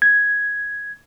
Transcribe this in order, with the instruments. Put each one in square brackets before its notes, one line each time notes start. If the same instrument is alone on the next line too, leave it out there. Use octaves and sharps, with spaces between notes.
[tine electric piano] G#6